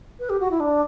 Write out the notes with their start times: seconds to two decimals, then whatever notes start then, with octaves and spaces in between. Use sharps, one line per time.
0.19 B4
0.29 G4
0.40 F#4
0.50 E4
0.60 D4